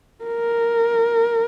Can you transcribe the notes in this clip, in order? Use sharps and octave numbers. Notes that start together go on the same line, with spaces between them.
A#4